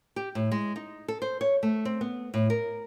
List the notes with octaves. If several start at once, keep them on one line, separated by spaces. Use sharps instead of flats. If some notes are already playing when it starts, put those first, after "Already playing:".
G4
A2
G#3
D#4
A4
C5
C#5
A3
C4
B3
A2
A#4